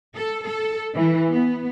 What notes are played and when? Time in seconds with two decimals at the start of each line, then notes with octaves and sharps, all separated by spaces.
0.16 A4
0.46 A4
0.94 E3
1.31 B3